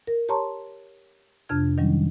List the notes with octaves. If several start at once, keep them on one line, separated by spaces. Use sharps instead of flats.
A#4
G4 C#5 A5 A#5 C6 C#6
F2 C3 D4 F6 G#6
D#3 F#3 G3 C#4 D#4